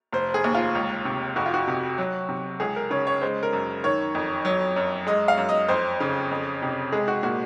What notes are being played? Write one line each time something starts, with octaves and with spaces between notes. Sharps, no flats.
F1 C5
G#4
D#2
F4
C#2
C3
F2 F#4
F4
F#4
C3
F#3
C3
C#2 G#4
A#4
C#3 C#5
C#5
G#3 C5
A#4
F#2
D#3 C#5
F2
F#3
F#2
G#3 D#5
F5
F#2
D#5
F2 C5
C#3
F2
C3
G#3 G#4
F#4
A#2 F#4